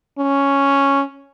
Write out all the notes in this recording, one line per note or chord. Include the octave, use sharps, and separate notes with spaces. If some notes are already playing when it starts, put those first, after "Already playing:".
C#4